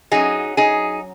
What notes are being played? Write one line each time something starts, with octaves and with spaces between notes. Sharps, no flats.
F#2 F#3 D#4 G#4
D#4 G#4